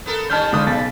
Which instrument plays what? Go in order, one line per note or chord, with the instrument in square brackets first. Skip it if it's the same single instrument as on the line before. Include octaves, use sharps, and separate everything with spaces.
[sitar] B3 A4 A#4
[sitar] D#3 G3 C#4 [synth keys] A5 F6 G6
[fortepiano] C#2 D3 D#6
[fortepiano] B1 C#3 [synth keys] A6 B6